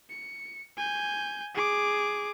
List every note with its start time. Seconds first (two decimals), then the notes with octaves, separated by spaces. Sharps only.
0.10 C#7
0.77 G#5 G6
1.55 G#4 D6